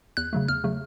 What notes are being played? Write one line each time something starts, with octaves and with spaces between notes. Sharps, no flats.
E2 F#6
C#3 F#3 A3
E2 F6
C#3 F#3 A3